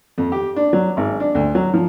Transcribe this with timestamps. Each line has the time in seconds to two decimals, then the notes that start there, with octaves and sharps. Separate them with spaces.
0.18 F2
0.32 G4
0.56 D4
0.73 F#3
0.97 G#1
1.20 D4
1.35 D2
1.55 F#3
1.74 F3